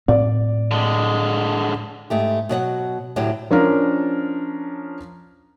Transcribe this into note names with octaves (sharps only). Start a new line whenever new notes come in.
A2 C4 D5
D3 G#3
G#2 A3 G4
B2 F#3 D#5 F#5
D2 A2 F#3 D4 G4
F3 C#4 D4 A#4